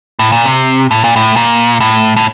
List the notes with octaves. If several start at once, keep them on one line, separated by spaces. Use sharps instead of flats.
A2
A#2
C3
A2
A#2
A2
A#2
A2
A2